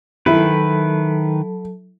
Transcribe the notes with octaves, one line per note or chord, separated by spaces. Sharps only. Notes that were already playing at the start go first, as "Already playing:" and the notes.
D#3 F#3 E4 A4 B4 A5